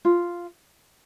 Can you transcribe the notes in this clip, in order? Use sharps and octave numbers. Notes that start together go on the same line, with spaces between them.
F4